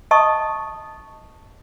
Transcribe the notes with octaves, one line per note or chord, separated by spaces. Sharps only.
D#5 A5 C#6 D#6